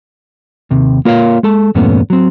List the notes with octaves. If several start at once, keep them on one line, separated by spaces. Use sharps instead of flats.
D#2 C3
A#3 F4 A#4 C#5 D#5 F5
G#3 A4 A5
E2 G2 A#2 A3 B3 C#4
F#3 C4